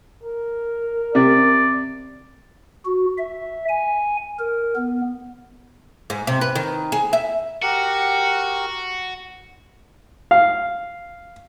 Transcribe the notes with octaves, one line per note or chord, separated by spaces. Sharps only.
A#4
C3 D5
F#4
E5
G#5
A#4
B3
G#2
C3
B4
D#3
G#4
E5
F#4 G4 A#4 F#5
F5